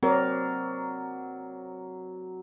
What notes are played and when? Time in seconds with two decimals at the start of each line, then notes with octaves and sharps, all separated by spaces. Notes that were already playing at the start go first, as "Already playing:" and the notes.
0.03 F#3 C4 A#4 D5